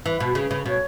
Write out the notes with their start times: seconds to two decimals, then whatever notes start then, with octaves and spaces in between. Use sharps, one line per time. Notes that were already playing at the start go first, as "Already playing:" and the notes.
0.05 E3 B4
0.20 B2
0.35 C#3
0.51 C#3
0.66 B2 C#5